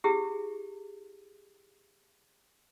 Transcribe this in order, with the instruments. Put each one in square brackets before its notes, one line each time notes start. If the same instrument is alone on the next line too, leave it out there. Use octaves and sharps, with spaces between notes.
[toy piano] E4 G4 G#4